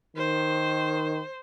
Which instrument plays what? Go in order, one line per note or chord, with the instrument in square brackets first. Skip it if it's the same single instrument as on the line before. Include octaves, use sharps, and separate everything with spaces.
[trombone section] D#3 [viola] C5